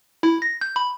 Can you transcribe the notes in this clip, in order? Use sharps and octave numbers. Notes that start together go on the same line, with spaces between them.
E4
A#6
G6
B5